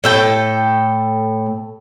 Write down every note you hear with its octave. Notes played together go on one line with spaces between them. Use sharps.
A2 A4 G5